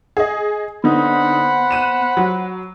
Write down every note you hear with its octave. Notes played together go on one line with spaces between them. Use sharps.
G#4 D#5
D3 B3 D#4 C5 F#5 B5
F#6 D#7 E7
F#3